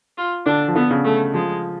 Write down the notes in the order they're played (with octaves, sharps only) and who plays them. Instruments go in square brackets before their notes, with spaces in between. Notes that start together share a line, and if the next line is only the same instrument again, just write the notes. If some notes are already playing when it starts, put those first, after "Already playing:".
[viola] F4
[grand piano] D3 [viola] D4
[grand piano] F3
[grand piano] D3 [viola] B3
[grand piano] C#3
[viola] A3
[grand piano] F3 [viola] G#3